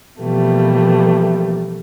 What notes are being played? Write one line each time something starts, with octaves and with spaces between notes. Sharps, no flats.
B2 E3 F3 G3 A3 A#3